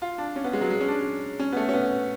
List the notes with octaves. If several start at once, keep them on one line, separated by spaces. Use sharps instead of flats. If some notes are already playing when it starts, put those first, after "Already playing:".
F4
D4
C#4
B3
G#3
F#3
G#3
C#4
D4
C#4
B3
A3
C#4
B3